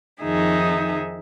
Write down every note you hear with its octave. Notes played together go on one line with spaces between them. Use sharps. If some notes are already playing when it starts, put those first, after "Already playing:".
F2 D#3 D#4 G#4 E5